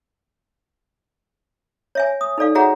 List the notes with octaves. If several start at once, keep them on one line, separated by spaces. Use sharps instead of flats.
C#5 E5 G#5
D#6
D#4 A4 D5 F5
F#4 G#4 C#5 E5 F#5 A#5